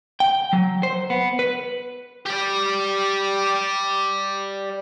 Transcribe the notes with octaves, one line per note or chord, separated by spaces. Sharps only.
G5
F#3
C5
B3
B4
G4 D5